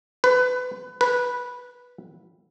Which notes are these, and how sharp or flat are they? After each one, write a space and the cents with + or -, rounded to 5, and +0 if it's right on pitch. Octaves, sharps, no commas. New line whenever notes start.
B4 +25
B4 -10